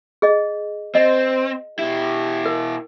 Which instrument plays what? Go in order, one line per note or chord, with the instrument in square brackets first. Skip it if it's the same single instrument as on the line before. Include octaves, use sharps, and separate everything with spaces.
[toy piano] G#4 D#5
[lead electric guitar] C4 [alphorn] C5 [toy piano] D#5
[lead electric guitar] B2 E4 [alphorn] G4
[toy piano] A#4